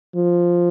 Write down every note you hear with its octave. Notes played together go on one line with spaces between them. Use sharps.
F3